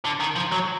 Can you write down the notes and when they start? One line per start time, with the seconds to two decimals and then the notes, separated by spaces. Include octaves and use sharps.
0.05 D3
0.20 D#3
0.36 F3
0.52 F#3